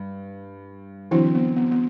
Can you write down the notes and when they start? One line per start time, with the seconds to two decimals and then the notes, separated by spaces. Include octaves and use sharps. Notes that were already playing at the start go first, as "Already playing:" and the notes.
Already playing: G2
1.11 D3 E3 F#3 C4 E4
1.35 B3
1.56 B3
1.71 B3